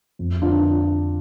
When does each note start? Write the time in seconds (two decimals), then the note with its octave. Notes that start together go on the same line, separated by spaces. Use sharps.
0.19 F2
0.41 D3 D4 F4